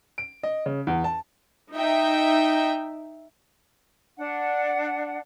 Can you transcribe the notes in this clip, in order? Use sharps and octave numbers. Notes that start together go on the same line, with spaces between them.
D7
D#5
C#3
E2
A5
D#4 E5 G5
D4 F#5